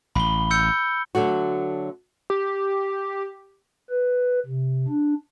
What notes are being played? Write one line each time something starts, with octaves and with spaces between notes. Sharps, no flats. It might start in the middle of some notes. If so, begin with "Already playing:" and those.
A1 B5 G7
E6 G6 C#7
D3 F#3 A3 F#4
G4
B4
C3
D4